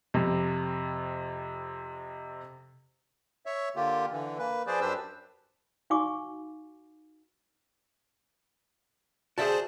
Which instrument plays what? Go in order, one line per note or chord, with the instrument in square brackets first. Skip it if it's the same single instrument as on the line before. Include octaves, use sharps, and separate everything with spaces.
[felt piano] F2 C3
[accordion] C#5 E5
D3 A#3 F4 G4
D3 E3
A#3 B4
F3 G#4 B4 C5 D5
F#2 D4 G4 B4 C5 E6
[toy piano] D#4 F#4 F5 G#5 C#6 D6
[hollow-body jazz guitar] F#4 D5 E5 [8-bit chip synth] G#4 C5 A5